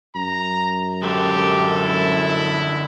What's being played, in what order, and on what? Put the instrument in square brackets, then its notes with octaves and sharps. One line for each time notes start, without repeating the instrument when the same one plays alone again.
[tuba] F#2 [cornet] A#5
[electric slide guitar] D3 G#3 A#4 [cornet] G4 [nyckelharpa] A4
[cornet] E4